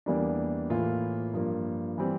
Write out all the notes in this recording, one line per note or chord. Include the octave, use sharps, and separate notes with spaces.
E2 E3 G3 A#3 D4
A2 E3 A#3 F4
G2 F3 A#3
E3 G3 C4